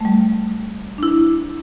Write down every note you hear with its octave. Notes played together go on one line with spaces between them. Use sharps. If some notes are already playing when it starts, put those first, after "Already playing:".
G3 A3
D4 E4